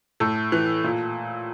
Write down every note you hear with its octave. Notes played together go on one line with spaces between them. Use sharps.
A2 A4
E3
A#2